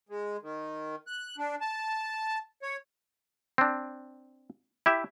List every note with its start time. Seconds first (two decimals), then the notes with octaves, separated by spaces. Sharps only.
0.09 G#3
0.42 D#3
1.07 F#6
1.38 D4
1.61 A5
2.62 C#5
3.58 C4 D4
4.86 E4 G4 E5